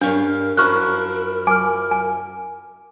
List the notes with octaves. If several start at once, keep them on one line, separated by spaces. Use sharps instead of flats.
G2 C#4 D4 A#4 F5
F#2 F3 E4 C#6 F6 F#6
G#5 D6 F6
G#5